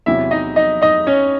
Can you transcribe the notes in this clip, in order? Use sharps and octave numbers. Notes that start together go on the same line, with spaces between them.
E2 C3 F#3 E4 E5
D#4 D#5
D#4 D#5
D#4 D#5
C#4 C#5